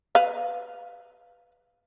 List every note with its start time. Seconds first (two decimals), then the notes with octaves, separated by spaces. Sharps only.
0.15 B4 F5